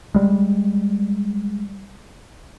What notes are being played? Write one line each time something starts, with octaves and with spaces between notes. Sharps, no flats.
G3 G#3